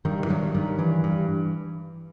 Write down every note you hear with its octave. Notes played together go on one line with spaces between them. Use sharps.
G2 D#3
E3
G2 F#3
G2 D#3
G2 E3
G2